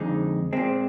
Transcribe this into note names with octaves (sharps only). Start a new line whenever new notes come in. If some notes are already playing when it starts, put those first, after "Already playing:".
Already playing: F2 D3 G#3 D#4
A#2 G#3 C4